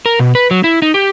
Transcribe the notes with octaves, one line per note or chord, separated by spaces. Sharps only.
A#4
B2
B4
F#3
E4
D#4
G4